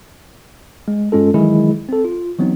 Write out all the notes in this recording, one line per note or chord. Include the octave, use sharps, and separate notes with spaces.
G#3
G2 G#3 C#4 F4 A4
D#3 E3 F#3 G#3 E4 G#4
C4 A4
F4
E3 F#3 B3 C4 D#4